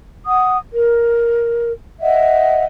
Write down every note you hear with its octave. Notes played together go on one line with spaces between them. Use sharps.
F#5 D#6
A#4
D#5 E5 F#5